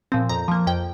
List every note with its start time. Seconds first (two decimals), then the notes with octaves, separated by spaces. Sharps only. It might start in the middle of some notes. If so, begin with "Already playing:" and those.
0.12 A#2 F3 C4
0.29 F2 A#5
0.48 F3 A#3
0.67 F2 G5